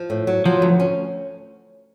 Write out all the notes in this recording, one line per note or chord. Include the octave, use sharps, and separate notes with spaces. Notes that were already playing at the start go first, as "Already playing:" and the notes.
Already playing: F3
A2
F#3
F3 F#3
D2
C#4